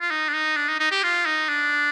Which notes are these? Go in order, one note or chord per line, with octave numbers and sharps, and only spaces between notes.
F4
D#4
D4
D#4
D4
D#4
D#4
G4
F4
D#4
D4